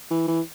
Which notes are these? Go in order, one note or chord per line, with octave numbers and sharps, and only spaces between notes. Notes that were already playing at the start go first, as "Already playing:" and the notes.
E3
E3